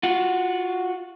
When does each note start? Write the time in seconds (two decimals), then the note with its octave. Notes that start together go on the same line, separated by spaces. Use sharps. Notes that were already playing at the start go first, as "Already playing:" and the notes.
0.03 F4 F#4